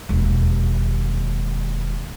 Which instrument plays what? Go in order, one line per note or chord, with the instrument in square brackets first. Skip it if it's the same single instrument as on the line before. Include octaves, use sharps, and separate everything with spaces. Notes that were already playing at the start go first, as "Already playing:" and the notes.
[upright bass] E1 D#2